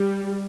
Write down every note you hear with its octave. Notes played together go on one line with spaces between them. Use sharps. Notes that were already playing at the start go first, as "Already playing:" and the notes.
Already playing: G3